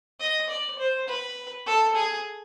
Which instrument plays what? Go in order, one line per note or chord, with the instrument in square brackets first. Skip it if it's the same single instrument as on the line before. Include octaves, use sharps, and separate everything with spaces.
[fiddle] D#5
D5
C5
B4
A4
G#4